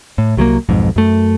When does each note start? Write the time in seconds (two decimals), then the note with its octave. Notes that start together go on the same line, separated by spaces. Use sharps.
0.18 A2
0.37 C2 F#3 G#3 A#3
0.69 B1 F2 G#2
0.96 F#2 A3